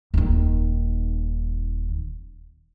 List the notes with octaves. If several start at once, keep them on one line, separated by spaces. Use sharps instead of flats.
D#1 D#3